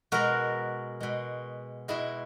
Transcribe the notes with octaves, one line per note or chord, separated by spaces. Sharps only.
B2 G#3 F#4 A#4
B2 G#3
B2 G#3 E4 G#4